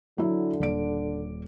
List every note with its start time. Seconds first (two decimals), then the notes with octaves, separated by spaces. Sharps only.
0.18 D3 F#3 E4
0.60 D#1 D5 D7